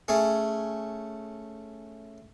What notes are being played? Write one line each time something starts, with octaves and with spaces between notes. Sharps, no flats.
A3 C#4 G#4